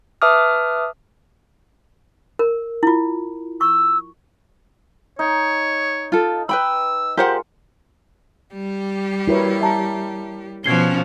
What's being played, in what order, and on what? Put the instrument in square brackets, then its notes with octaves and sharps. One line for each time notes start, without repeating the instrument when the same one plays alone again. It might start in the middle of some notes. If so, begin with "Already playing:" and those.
[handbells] B4 E5 A5 D6 D#6 F6
[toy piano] A#4
E4 F4
[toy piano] C#6 [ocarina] E6
[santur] D#4 [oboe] C#5
[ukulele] F4 A4
[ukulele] B4 G5 B5 [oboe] E6
[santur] G#3 F4 A#4 [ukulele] G4 C5 F#5
[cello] G3 G4
[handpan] E4 A#4 C#5 [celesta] F#4 B4
[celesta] E5 A5 A#5
[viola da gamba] B2 F3 [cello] C#4 [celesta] G#6 C7 G7